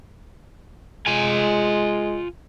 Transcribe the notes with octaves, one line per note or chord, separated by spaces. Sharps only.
G#3 F4 G#5